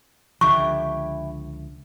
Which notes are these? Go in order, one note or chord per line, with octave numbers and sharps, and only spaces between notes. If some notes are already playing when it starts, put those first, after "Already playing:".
C#2 D3 F3 D4 E4 G4 C#6